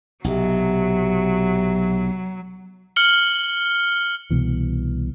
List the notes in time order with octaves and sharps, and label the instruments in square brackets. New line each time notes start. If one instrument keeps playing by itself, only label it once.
[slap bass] B1 [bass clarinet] C3 [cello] F#3
[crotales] F6 C#7 F#7 G7
[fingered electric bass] C2 B2 E3